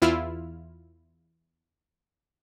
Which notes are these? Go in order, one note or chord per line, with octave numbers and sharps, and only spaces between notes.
E2 E4 F4 E6 F6